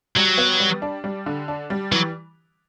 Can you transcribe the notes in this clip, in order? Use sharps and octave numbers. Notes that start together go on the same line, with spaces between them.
F#3 G3
B3
G3
D4
G3
D3
D4
G3
E3 F#3